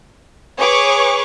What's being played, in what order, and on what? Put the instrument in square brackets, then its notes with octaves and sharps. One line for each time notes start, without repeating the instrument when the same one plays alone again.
[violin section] G#4 B4 C#5 C#6 D6